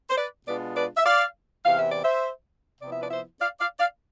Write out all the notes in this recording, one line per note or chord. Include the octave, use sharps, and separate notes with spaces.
C5
B4 D5
B2 G#3 B3 D4 F4 B4 D5
B4 D5
E5
D5 F5
E2 C3 E3 F5
E5
D5
C5 E5
C3 F3 B3 E4 D5
E5
B4 D5
C5 E5
D5 F5
D5 F5
D5 F5